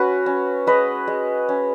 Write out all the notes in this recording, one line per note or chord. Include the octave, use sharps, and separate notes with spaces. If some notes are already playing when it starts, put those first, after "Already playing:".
Already playing: C#4 F#4 B4
C#4
G#3 B4 D#5
G#3
C#4